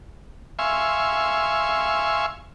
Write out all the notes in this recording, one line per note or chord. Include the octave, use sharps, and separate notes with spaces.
E5 F5 G#5 C6 C#6